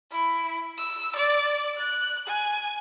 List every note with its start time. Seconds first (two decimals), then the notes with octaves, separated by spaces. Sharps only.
0.12 E4
0.78 E6
1.16 D5
1.76 F#6
2.27 G#5